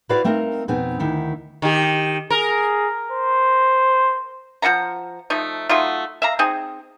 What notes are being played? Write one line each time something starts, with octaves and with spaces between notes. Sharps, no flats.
E4 F#4 B4 C5 D5 F5
A3 C4 D#4 A#4 D#5 F5
F2 B2 B3 C4 D#4 G#5
D2 D#3 D#4 E4
D#3 G4
G#4 A#4
C5
F3 F4 F#5 A#5
F3 A3 D#4
F#3 A3 D#4 F4
E5 F5 A#5
C4 D#4 G#4